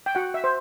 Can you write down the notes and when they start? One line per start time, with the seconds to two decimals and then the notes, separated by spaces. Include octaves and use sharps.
0.06 G5
0.15 F#4 F#5
0.34 E5
0.44 C5